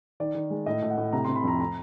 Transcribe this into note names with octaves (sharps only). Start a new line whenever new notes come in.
D#3 D5
D#3
G#3
A2 D#5
A2
F#5
A2
C3 A#5
C3 C6
B5
F2 A#5
A#5